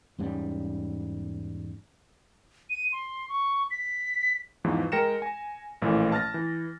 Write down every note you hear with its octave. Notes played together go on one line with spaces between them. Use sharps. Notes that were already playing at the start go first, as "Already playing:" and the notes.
E2 G#2 G3 C#4
D#7
C6
C#6
B6
E2 G#2 E3 F3
G#3 A#4 G5 A#6 C#7 E7
G#5
A1 A#2 E3 F3 A3
A5 F6 A6 A#6
E3